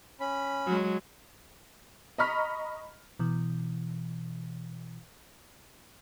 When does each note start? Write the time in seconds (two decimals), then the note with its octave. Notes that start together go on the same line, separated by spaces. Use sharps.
0.20 C#4 B5
0.66 F#3 G#3
2.18 D#5 A#5 B5 C#6 F6 B6
3.19 B2 E3